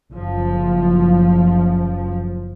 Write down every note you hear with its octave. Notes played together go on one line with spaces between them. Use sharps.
F#1 F3